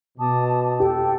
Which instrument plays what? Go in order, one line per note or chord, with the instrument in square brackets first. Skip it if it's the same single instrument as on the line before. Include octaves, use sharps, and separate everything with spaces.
[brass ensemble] B2 [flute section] A5 D6 D#6
[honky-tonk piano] G4 [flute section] A4 G5